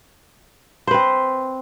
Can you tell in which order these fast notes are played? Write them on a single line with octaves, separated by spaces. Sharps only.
C5 B4 C4